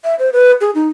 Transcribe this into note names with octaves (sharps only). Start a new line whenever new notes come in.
E5
C5
B4
G#4
D#4